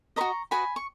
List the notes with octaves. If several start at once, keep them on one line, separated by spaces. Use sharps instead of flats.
F#4 B4 D#5 A#5 C#6
F#4 B4 D#5 G#5 B5
C#6